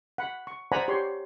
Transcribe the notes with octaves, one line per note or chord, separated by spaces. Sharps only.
F#5 B5
C#6
C5 D5 F#5 G#5 A#5 B5
G4 C#5 C6